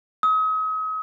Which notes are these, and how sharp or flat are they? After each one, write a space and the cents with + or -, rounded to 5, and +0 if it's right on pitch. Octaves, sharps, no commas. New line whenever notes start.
D#6 +40